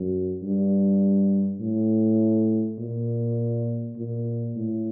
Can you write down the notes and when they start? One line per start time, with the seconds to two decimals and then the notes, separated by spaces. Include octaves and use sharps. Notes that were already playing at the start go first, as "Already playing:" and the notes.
Already playing: F#2
0.42 G2
1.60 A2
2.78 A#2
3.96 A#2
4.55 A2